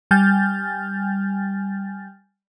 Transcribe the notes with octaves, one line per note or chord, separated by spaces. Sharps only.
G3 G5 G#5 F6 G6 A6